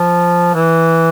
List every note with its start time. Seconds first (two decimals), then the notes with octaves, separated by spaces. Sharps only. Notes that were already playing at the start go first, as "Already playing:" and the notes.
Already playing: F3
0.54 E3